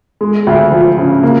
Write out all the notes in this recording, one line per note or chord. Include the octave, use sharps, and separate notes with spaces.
G#3
D2
F3
C#3
A#3